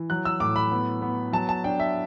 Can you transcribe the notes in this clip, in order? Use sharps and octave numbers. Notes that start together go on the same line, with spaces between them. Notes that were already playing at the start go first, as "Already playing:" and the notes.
Already playing: E3
F#3 F#6
E6
A2 D6
B5
B3
B3
F#3 A5
A5
D4 G5
E5